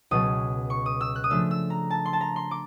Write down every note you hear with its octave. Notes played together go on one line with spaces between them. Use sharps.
C#2 B2 F#3 D#6
C#6
D#6
E6
F#6
D#6
C#3 F3 A3 D4 E6
E6
A#5
A5
C6
A5
A#5
C6
D6